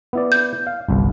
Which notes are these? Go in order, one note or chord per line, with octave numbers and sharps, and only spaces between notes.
B3 E4 D5
G6
F5
G1 C2